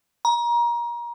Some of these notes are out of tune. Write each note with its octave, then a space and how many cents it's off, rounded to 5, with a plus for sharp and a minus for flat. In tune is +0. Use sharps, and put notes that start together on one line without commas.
A#5 +30